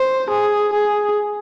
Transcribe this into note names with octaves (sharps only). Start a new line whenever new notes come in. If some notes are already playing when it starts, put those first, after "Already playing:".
Already playing: C5
G#4
G#4